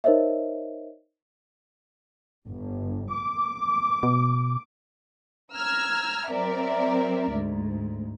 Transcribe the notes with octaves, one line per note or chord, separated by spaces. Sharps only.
D#4 A#4 C5 C#5 D#5 E5
G1
D6
B2
A#5 E6 F6 G#6
F#3 C4 A#4 D5 E5
D2 G#2